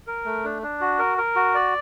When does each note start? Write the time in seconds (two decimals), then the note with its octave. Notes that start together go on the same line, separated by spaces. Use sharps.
0.07 A#4
0.25 A3
0.44 D4
0.62 D4
0.81 F#4
0.99 A#4
1.18 A#4
1.36 F#4
1.55 D5